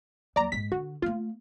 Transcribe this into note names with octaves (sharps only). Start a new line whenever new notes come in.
D#2 F#3 D5 A#5
G#2 G#3 B6
D3 F#4
A3 B3 F4